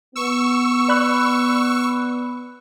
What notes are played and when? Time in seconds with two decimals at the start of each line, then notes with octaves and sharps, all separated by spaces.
0.16 B3 C#6 E6
0.88 D5 B5 F#6